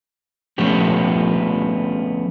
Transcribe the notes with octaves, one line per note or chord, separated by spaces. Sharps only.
F3 A3 B3 C#4 G4